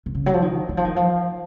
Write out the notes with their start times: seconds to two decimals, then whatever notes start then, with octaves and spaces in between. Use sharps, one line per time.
0.06 C3
0.15 C#3
0.26 F#3
0.34 F3
0.42 D#3
0.69 D#3
0.77 F3
0.85 D#3
0.96 F3